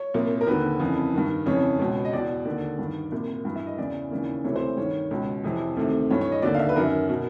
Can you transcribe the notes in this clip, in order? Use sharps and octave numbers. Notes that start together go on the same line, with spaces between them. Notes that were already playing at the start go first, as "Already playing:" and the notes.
Already playing: C#5
C2 A#2
A#4
D#2 D3 B4
F2 C#3 E3
G2 D#3
F2 C#3 E3 C#5
C#2 B2
D#5
E2 B2 D5
D#2 D3
G2 D#3
C2 A#2
G2 E3
E5
D#5
E2 C#3 E3 D5
D#2 C#3 E3
D2 C3 E3 C#5
C5
G2 D#3 C#5
C#2 B2
F2 C3 E3
D2 C3 D#3
G2 E3 C#5
C#5
D#5
D#2 D3 D5
F5
E5
B4
F#2 D#3 A#4
B2